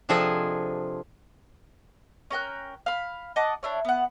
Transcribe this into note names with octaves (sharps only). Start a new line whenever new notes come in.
C3 F3 D4 G#4 A4 D#5
C#4 A#4 G5 F#6
F5 B5
D#5 F#5 A5 D6
D4 E4 C#5
B3 F#5